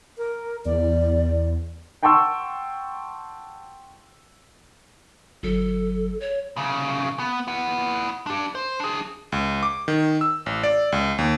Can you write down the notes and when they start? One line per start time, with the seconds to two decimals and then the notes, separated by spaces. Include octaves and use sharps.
0.18 A#4
0.65 E2 D5
2.03 F#5 G5 A5 C6 C#6 E6
5.43 G1 F#3 A4
6.20 C#5
6.57 C2 C#3
7.19 B3
7.48 E4 F#5
8.27 D4 G4
8.55 C5
8.80 D4 G#4
9.32 C#2
9.63 D6
9.88 D#3
10.21 E6
10.46 A1
10.63 D5
10.92 C#2
11.18 D#2